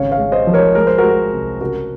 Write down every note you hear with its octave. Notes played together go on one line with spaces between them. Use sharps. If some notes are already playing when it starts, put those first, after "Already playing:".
Already playing: G#1 C#3 C#5 F5
C#5 F5
G#3
C5 D#5
F3
A#4 C#5
G#3 A#4
C5
G#3 F#4 A#4
C2
C#3 F#4 A#4